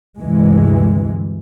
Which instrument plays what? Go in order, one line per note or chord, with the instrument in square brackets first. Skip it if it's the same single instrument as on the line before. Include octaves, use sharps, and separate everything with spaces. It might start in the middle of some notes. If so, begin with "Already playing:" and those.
[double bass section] D2 G2 C3 E3 G#3